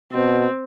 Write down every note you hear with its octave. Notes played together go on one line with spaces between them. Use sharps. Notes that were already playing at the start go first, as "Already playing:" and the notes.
B2 C4